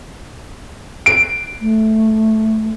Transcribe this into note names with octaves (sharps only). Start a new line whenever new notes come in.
D7
A3